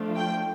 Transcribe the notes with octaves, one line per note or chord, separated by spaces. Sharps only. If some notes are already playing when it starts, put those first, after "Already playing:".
Already playing: F3 A3 D4 F4
G5